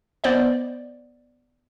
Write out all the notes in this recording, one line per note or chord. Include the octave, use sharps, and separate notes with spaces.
B3 C5 D5 D#5